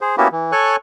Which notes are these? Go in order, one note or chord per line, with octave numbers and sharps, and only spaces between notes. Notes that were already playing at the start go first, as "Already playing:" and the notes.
G#4 C5
A#3 B3 C#4 E4 F#4 G4
E3
A4 C#5 G#5 C#6 F#6